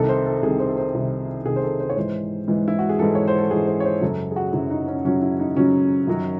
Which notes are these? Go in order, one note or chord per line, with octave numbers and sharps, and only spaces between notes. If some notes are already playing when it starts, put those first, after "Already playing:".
Already playing: C2 C3 D#3 A4
C5
A4
C2 C3 D#3 G#4
C5
A4
C5
C2 C3 D#3
C2 C3 D#3 G#4
C5
A4
C5
C#5
G#2 E3 C5
G#2 E3
E4
F#4
G#4
G#2 E3 A4
C#5
C5
A4
G#2 E3 G#4
C5
C#5
C5
F#2 C#3 F#3 A4
G#4
F#4
F#2 C#3 F#3 E4
D#4
C#4
F#2 C#3 F#3 C#4
E4
D#4
F#2 C#3 F#3 C#4
F#2 D#3 F#3